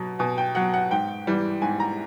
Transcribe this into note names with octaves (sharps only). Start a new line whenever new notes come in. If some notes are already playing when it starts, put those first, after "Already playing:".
Already playing: B2 F#3
B2 G#5
G5
F#3 F#5
F#5
G#2 G5
E3 G3
G#2 G#5
A#5